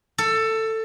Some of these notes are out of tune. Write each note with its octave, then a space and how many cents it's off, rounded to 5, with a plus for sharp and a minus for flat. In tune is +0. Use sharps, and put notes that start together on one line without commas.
A4 +15